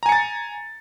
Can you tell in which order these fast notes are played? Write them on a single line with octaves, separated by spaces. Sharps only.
A#5 G#5 C#7 A6